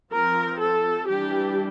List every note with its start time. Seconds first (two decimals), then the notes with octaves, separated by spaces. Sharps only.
0.13 F3 C4 A#4
0.60 A4
1.07 E3 G3 D4 G4